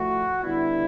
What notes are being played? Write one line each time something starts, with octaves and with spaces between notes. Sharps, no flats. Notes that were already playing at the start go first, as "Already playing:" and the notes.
Already playing: A2 F3 A3 F#4
D3 G3 B3 D4 E4